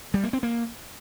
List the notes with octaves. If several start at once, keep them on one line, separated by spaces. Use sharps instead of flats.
G3
A#3
C4
A#3